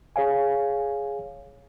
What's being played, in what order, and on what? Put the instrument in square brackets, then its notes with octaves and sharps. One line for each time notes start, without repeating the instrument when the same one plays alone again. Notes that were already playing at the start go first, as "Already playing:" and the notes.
[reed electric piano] G#4 C#5 F5 G#5